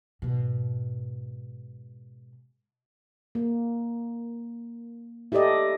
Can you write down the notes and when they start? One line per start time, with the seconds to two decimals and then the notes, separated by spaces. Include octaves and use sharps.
0.22 G#2 B2
3.35 A#3
5.32 E4 G4 A4 D5 D#5